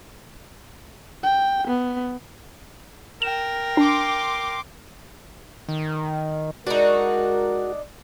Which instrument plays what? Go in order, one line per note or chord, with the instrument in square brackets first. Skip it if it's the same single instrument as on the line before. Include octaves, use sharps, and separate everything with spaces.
[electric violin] G5
B3
[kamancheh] A#4 G5 [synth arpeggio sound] E7
[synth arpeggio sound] D4 [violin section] C6 D6
[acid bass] D#3
[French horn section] G#3 A#4 [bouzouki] D4 D#4 [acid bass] F#4